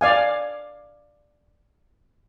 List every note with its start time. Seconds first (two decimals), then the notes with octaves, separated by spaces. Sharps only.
0.01 D5 F5 G#5